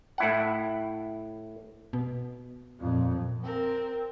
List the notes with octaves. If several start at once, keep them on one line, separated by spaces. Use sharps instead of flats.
A2 E4 F#5
B2
F2 A#2
C4 A#4